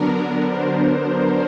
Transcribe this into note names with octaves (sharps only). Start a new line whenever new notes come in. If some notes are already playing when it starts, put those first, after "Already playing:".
Already playing: D3 F#3 B3 D4 A#4
C5